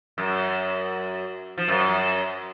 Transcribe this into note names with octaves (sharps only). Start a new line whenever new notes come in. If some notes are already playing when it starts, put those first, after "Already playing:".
F#2
F3
F#2